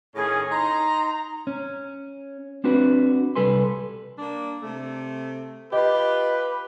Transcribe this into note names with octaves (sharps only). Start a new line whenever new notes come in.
A2 D#3 C#4 G#4
D#4 A#5 C6
C#4
C4 D4 F#4 B4
C2 G3 A4 B4 G#5 C6
A#3 D4
C3 A3
F4 G4 B4 D#5